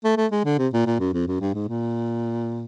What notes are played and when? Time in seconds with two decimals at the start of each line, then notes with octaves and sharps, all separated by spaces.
0.04 A3
0.17 A3
0.31 G#3
0.45 D3
0.58 C3
0.73 A#2
0.86 A#2
1.00 F#2
1.14 F2
1.28 F#2
1.41 G2
1.54 G#2
1.68 A#2